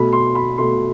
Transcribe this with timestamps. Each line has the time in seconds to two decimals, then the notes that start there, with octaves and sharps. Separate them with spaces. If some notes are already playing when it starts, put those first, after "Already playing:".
Already playing: B2 A3 B5
0.13 C6
0.35 B5
0.58 B2 A3 C6